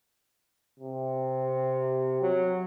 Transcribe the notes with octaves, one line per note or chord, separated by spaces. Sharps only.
C3
F#3